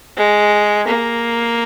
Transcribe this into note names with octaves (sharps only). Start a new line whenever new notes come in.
G#3
A#3